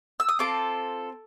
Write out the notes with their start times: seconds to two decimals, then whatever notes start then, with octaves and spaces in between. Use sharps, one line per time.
0.20 E6
0.29 D#6
0.39 C4 F4 A4 D6